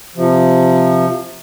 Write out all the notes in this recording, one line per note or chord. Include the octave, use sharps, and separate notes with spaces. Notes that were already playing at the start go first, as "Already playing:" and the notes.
C3 F3